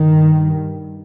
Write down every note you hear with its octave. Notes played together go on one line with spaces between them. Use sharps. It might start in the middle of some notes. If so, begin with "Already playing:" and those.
Already playing: G2 D#3